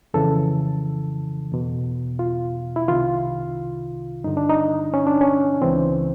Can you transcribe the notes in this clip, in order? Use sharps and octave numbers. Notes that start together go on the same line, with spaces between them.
F2 C#3 E3 A4
E2 B2
F4
E4
C2 C3 D#3 F4
G2 D3 D#4
D4
D#4
C#4
D4
C#4
C#2 C#3 E3 C4